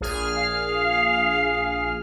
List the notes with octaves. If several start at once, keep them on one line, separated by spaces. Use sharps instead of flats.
A#1 G#4 F6
F5